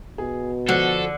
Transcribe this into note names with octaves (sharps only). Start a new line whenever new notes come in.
B2 G#4
D3 F3 F#4 A4